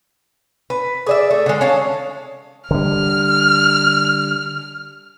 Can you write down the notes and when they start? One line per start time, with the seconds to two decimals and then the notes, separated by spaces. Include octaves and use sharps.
0.70 B4
1.07 G#4 D5 E5
1.31 A3
1.46 D3 G#3
1.61 C#4 F5 A5
2.71 D3 G3 F6